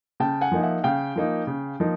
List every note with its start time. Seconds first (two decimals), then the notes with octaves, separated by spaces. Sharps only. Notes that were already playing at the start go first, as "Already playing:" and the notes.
0.20 C#3 G5 A5
0.41 F#5 G#5
0.52 F3 A#3 D#4
0.62 E5 F#5
0.83 C#3 F5 G5
1.16 F3 A#3 D#4
1.47 C#3
1.80 F3 A#3 D#4